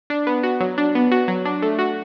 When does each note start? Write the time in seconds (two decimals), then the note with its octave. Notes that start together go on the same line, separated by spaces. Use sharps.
0.10 D4
0.27 B3
0.43 F#4
0.61 F#3
0.78 D4
0.95 B3
1.11 F#4
1.28 F#3
1.45 D4
1.62 A3
1.79 F#4